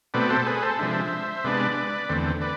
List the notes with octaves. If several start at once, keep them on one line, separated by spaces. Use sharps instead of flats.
B2 A3 C4 B4 D5
A4 C5
G#4 B4
A4 C5
C3 F3 G#3 D4 C5 E5
C3 G#3 B3 D4 B4 D5
E2 D3 A3 C4
B4 D5